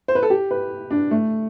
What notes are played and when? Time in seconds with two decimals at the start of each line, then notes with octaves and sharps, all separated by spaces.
0.08 C5
0.15 B4
0.23 A4
0.30 G4
0.51 B4
0.91 D4
1.11 A3